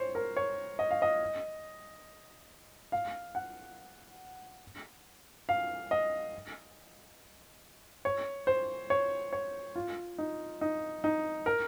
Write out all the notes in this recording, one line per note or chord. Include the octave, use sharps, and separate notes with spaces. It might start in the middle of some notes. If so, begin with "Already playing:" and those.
Already playing: C5 C#5
A#4
C#5
D#5
F5
D#5
F5
F#5
F5
D#5
C#5
C5
C#5
C#5
F4
D#4
D#4
D#4
A#4